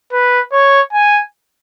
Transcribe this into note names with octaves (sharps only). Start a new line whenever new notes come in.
B4
C#5
G#5